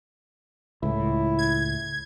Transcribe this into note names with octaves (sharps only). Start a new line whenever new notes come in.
C#2 A2 E4
G#6